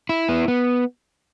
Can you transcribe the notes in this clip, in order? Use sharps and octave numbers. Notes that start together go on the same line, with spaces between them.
E4
B3
B3